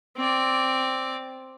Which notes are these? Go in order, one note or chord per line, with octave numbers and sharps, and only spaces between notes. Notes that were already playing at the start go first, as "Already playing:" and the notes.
C4 D5